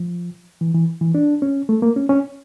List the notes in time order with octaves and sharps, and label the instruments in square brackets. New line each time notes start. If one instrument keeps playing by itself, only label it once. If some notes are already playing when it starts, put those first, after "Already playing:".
Already playing: [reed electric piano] F3
E3
E3
E3
D4
C#4
A3
A#3
C#4
C#4